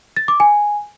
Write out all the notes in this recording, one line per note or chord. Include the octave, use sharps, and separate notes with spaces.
A6
D6
G#5